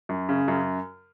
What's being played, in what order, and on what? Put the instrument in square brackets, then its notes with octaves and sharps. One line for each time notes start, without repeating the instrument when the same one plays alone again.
[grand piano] F#2
C#3
F#2